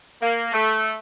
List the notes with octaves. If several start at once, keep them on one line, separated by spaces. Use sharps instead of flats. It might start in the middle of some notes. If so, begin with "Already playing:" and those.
A#3
A3